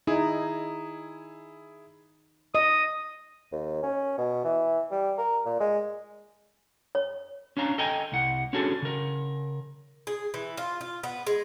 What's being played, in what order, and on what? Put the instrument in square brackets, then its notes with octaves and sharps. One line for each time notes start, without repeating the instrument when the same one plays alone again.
[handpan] D#4 [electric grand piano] E4 G#4
[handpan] D#5 [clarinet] D#6
[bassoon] D#2
C#4
B2
E3
G3
A#4
A#2
G#3
[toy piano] C#5
[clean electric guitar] C#4 D4 F5 A#5
A4 D#5 G5 G#5 A#5
C2 F#5
C#4 D4 F#4 G#4 A4
C#3 A#4
[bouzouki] G#4
E3
F4
F4
B3
G#3